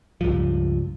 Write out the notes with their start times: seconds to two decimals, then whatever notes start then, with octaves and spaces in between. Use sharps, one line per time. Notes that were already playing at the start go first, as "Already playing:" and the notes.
0.21 C#2 G2 F3